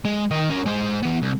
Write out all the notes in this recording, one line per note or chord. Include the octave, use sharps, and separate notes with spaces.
G#3
D#3 D#5
C#4 A#4
G#3 C5
E3 B3
C2